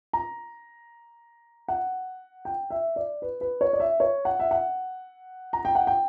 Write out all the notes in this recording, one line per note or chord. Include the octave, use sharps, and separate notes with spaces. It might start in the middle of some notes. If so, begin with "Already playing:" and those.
A#5
F#5
G5
E5
D5
B4
B4
C#5
D5
E5
C#5
F#5
E5
F#5
A#5
G5
F#5
G5